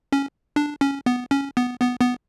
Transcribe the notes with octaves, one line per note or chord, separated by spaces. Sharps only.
C#4
D4
C#4
B3
C#4
B3
B3
B3